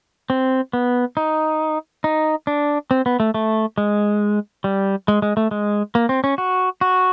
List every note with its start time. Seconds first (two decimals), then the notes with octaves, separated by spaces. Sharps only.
0.30 C4
0.73 B3
1.17 D#4
2.04 D#4
2.47 D4
2.91 C4
3.06 B3
3.20 A3
3.34 A3
3.78 G#3
4.64 G3
5.08 G#3
5.22 G#3
5.37 A3
5.51 G#3
5.95 A#3
6.09 C4
6.24 C#4
6.38 F#4
6.81 F#4